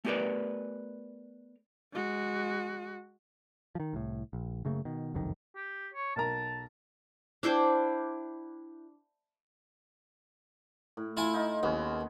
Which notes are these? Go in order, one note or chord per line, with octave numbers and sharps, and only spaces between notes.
A3 B3 G4 A#4 B4 D5
G#3 F#4
D#3 F3
C2 A2
A#1
F#1 C#3 A3 A#3
B2 D#3
F#1 C2 F2 D#3
G4
C#5
B1 A#4 A5 A#5
D4 E4 C5 G5
A2
E4 F4 G#5
D#4 F4 D#5
D#2 B3 C#4 G#4